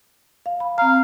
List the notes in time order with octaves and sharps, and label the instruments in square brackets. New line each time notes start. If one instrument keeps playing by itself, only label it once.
[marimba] F5
B5
[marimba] C4 A#5 [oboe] F5